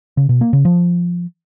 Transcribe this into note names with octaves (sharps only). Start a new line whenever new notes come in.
C#3
B2
A#3
C#3
F3